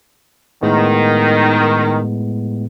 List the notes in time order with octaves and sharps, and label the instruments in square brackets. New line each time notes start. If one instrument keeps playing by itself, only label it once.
[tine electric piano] A2 G#3 B3 [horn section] D#3